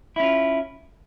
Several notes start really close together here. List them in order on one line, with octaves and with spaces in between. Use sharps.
E4 C#4 F4